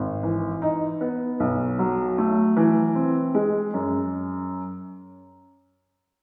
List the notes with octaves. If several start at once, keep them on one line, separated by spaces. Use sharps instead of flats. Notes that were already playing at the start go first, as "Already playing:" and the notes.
Already playing: G#1
E3
D#4
B3
B1
F#3
A3
E3
C4
G#3
F#2